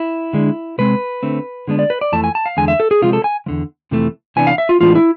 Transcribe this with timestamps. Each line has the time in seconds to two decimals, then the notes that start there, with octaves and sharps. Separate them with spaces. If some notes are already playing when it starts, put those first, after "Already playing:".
Already playing: E4
0.33 D3 G#3 D4
0.78 C3 G#3 C4 B4
1.23 D3 A3 C4
1.68 D3 G#3 B3 D4
1.79 D5
1.90 B4
2.01 D5
2.12 F2 E3 A3 A5
2.24 G#5
2.35 A5
2.46 F5
2.57 E2 D3 G#3 G#5
2.68 E5
2.80 A4
2.91 G#4
3.02 C3 F3 G#3 F4
3.13 A4
3.24 G#5
3.46 E2 D3 F3
3.91 F2 C3 E3 A3
4.36 C3 E3 B3 D4 G#5
4.47 F5
4.58 E5
4.69 F4
4.81 A2 E3 G#3 B3 D4 F4
4.95 E4